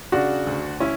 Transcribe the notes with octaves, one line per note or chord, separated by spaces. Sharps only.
C#3 D4 F#4
D2
C#4 E4